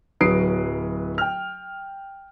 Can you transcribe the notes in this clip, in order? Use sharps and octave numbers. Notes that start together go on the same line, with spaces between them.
D1 F#3 B4 D#6 C7 D7
G5 F6